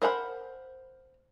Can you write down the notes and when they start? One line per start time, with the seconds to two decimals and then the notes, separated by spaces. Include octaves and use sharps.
0.02 A#4 C5 F#5 A#5 B5